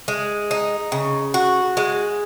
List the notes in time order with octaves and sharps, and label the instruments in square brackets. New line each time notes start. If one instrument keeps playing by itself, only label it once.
[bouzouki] G#3
D#4
C#3
F#4
G#3